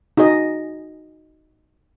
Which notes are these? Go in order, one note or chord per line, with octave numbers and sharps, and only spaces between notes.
D#4 F#4 G#4 D#5